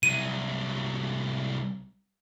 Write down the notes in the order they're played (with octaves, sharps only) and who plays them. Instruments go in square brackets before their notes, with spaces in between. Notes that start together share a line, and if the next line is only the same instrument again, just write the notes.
[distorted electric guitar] C2 F#3 [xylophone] D#7